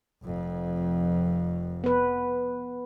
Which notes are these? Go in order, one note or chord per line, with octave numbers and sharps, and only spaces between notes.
F1 F2
B3 B4